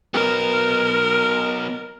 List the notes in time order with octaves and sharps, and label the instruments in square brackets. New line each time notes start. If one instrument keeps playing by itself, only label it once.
[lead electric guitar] F#3 B3 [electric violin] A#4